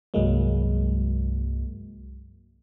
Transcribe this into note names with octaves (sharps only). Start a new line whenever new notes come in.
C2 G2 F#3 G#3 A#3